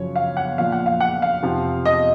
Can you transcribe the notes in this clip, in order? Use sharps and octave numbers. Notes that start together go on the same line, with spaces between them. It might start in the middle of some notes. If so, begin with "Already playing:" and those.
Already playing: F#2 C#3 F3 C#5
F5
F#5
A#2 F3 F5
F#5
F5
F#5
F5
F2 C3 F3
D#5